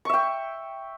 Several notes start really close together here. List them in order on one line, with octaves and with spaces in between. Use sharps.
C#6 E5 G5